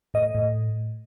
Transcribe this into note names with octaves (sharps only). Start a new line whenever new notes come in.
A2 D#5
A2